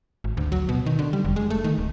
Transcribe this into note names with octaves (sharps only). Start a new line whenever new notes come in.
G#1
D2
F#3
B2
D#3
D3
G3
F1
G#3
A3
D#3
D1